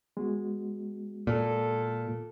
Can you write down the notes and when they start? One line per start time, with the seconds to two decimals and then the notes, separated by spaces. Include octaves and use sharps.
0.17 G#3 B3 F#4
1.27 A#2 A4